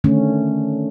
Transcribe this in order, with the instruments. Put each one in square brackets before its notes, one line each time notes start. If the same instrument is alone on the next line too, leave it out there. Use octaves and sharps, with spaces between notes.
[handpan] D3 D#3 A3 C#4